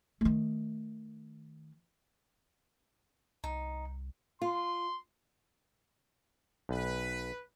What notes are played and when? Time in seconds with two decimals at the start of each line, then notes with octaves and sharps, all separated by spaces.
0.21 D#3 A3
3.44 C2 D#4
4.42 F4 C6
6.69 B1 B4